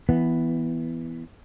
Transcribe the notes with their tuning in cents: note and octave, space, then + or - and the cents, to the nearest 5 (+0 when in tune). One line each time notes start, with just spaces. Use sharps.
E3 +0 B3 +0